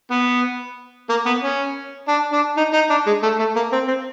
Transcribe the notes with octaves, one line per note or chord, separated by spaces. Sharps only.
B3
A#3
B3
C#4
D4
D4
D#4
D#4
D4
G#3
A3
A3
A#3
C4
C4